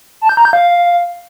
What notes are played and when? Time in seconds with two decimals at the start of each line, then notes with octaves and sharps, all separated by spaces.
0.21 A5
0.29 G6
0.37 A#5
0.45 G6
0.53 F5